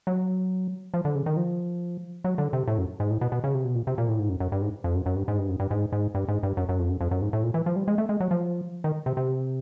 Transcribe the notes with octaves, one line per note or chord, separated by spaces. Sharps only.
F#3
F3
D3
C#3
D#3
F3
F#3
D3
C3
A2
F#2
G#2
A2
B2
B2
C#3
C3
B2
A#2
C3
A#2
A2
G#2
F#2
F#2
G2
G#2
F2
F#2
F#2
G2
G#2
G2
F#2
G2
G#2
G#2
G2
G#2
G2
F#2
F#2
F2
F#2
F2
F#2
G#2
A2
A#2
E3
F3
G3
G#3
A3
G#3
F#3
F3
D#3
C3
C3